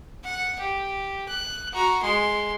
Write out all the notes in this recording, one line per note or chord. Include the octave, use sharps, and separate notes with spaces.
F#5
G4
F#6
F#4 A#5
G#3 C6